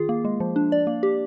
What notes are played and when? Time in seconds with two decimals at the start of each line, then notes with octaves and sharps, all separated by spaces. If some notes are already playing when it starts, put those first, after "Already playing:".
Already playing: D#3 F4 G#4
0.09 A#3
0.25 G#3
0.40 F3
0.56 D4
0.72 D5
0.87 A#3
1.03 G4